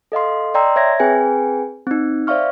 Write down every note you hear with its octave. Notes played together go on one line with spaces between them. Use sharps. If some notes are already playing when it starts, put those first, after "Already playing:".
A4 D#5 F5 C6
D5 D#5 G5 A#5 C6 E6
C#5 E5 G#6 A#6
C4 G#4 B4 G5 G#5
C4 D#4
C5 D5 E5 F5 C#6 F6